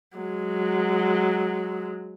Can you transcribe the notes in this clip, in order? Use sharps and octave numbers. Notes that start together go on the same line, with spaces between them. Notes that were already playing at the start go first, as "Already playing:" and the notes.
F#3 G#3